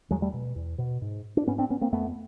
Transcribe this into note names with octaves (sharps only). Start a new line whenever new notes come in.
E2 F#3 G#3
G3 A3
B2
E2
B2
G#2
D4
G#2 B3 C#4
C4 D4
B3 C#4
A#3 C4
F2 A3 B3